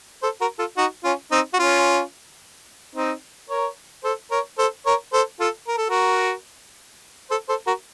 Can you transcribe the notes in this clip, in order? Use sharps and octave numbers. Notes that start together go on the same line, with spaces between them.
A4 C5
F#4 A#4
F4 A4
D#4 F#4
C#4 F4
C4 D#4
F#4
C#4 F4
C4 D#4
A#4 C#5
A4 C5
A#4 C#5
A4 C5
A#4 C#5
A4 C5
F4 A4
A#4
A4
F#4 A#4
A4 C5
A4 C5
F#4 A#4